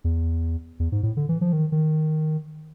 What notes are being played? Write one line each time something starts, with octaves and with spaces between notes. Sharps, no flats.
E2
E2
G#2
A2
D3
E3
F3
D#3
D#3